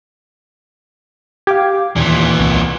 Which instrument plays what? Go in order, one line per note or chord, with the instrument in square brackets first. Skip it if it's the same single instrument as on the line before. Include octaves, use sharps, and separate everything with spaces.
[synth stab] G4 [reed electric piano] F5 D6 G#6
[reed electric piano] D#2 D#3 [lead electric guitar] A#2 E3
[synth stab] C2